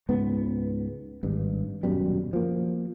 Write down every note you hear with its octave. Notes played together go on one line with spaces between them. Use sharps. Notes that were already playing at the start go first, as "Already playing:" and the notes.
C#2 G#2 B3
G#1 G2
D#1 F#2 B2 G3
F3 A#3